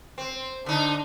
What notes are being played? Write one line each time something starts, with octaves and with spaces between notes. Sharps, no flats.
C4
D3 D4 D#4